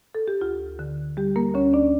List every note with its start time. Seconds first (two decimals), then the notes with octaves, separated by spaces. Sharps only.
0.15 A4
0.28 G4
0.41 D2 F4
0.79 D3
1.17 G3 G4
1.36 A#3 A#4
1.54 D2 C#4 C#5
1.73 D4 D5